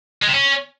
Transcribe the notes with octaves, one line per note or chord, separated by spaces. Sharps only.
G#3
C3
C#4